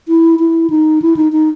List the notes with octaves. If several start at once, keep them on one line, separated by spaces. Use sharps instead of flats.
E4
E4
D#4
E4
D#4
D#4